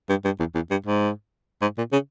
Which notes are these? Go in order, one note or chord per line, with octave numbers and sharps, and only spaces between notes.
G2
G2
E2
E2
G2
G#2
G#2
A#2
C#3